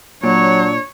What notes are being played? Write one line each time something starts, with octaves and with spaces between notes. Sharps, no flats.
A#2 F#3 D4 C#5